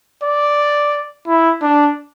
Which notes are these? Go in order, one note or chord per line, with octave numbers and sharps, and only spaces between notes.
D5
E4
D4